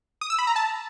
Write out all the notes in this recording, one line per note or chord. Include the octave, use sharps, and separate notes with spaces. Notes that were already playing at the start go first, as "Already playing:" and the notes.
D#6
E6
B5
A#5
A5